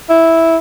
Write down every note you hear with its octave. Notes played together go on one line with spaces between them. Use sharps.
E4